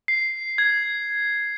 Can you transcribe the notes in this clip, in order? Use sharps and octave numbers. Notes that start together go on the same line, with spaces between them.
C7
G#6